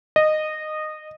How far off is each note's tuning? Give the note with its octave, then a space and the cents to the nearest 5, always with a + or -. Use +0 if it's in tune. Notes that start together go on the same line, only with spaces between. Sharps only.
D#5 -15